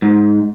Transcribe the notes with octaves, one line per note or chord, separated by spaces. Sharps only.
G#2